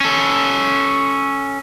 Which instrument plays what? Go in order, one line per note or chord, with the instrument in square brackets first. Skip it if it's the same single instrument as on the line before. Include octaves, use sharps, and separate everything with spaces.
[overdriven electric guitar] C#4 A4